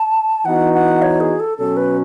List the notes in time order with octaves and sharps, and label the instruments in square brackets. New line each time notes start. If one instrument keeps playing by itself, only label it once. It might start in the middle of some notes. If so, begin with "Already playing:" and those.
Already playing: [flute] A5
[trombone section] E3 B3 D#4 F#4 [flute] F#5
[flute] F#5
C#5
G#4
A4
[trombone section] B2 F#3 C#4 [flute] A4
[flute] B4